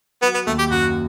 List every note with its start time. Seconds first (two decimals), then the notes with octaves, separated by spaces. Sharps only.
0.22 F#3 B3
0.34 B3
0.46 D#2 A3
0.59 G4
0.71 F#2 F#4